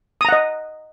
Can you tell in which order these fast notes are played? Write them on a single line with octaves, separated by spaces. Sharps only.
D#6 A#5 F#5 D#5